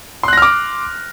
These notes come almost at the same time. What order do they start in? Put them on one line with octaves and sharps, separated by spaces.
C6 F#6 A#6 F6 D6